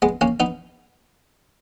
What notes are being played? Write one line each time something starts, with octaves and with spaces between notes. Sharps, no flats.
G#3 B3
A#3 C#4
B3 D#4